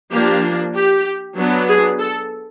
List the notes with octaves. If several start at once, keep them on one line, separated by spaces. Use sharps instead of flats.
F3 A#3 D4 G4
G4
F#3 B3 D4
G#4
A4